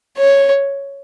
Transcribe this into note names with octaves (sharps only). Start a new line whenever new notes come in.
C#5